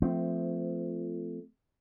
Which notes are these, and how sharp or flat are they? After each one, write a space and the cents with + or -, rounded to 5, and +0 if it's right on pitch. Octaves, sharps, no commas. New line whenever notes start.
F3 -10 A3 +0 C4 -25